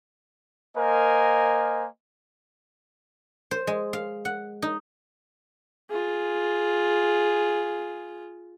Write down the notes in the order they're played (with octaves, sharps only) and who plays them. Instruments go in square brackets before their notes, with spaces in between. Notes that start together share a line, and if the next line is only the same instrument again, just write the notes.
[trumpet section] A#3 A#4 C5 D#5 G#5
[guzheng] C5
G#3
F5
F#5
D#4
[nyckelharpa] F4 G#4